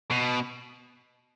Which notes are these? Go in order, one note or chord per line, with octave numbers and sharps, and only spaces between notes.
B2